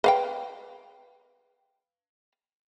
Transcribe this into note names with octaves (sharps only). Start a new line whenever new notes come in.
B4 F5 G5